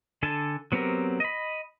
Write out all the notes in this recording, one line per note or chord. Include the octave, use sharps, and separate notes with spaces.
D3 D4 A4 G#5 A5
F#3 B3 C4 G4 A#4
D#5 B5